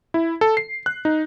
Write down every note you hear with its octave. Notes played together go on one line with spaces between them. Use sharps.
E4
A4
C7
F#6
D#4